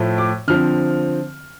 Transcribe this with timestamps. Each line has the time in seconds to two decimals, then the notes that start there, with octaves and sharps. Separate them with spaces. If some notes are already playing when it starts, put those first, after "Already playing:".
Already playing: A2 F3 A3
0.18 D6
0.48 D3 F3 C4 F6